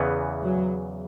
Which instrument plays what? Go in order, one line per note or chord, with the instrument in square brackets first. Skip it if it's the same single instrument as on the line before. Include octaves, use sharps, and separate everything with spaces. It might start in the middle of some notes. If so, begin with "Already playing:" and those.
Already playing: [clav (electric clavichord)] E2 C#3 E3 B3
[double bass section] F#3